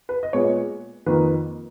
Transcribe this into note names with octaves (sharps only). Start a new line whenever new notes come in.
B4
D#5
A#2 G#3 B3 C#5
F2 D#3 A#3 B4